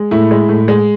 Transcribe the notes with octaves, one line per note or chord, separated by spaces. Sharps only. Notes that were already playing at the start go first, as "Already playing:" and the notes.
Already playing: G#3
A2 E4
G#3
A2
G#3